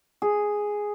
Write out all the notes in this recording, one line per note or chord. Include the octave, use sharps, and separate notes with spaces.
G#4